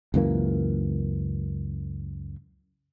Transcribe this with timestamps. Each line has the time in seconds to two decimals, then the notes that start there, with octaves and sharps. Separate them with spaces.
0.14 C#2 F#2 E3 A#3